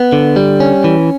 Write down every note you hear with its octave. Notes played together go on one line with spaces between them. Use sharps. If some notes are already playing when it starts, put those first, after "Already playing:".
Already playing: B3
D3
G3
C#4
E3